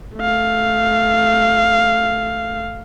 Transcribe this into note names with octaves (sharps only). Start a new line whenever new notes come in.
A3 F5